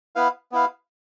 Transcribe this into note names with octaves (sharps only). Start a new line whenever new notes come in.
B3 E4 B4 F5
B3 E4 B4 F5